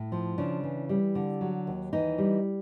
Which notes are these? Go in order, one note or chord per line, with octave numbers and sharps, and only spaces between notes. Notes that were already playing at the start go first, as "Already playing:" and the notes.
Already playing: A2
F3
C#3 D4
E3
G3
D3
F#3
D#2
E3 D#4
G3